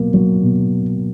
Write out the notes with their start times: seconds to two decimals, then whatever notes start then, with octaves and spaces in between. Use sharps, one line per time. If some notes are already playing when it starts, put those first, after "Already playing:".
Already playing: B2 F#3 A#3
0.14 F#3
0.43 B2